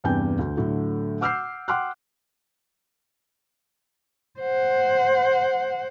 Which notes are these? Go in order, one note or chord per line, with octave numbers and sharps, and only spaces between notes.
E2 G2 C3 G5 G#5 G6
D2
A2 D3 F#3 A3
F#5 D6 E6 F6 G6 C7
F#5 G5 C6 D6 F6 F#6
C5 F#5